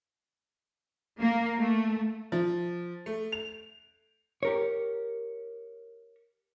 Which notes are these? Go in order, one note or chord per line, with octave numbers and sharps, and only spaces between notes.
A#3
A3
F3
A3
F7
G4 A#4 C#5